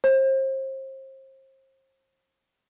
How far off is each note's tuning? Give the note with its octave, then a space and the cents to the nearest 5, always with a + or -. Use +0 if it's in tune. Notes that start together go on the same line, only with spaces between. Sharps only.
C5 +35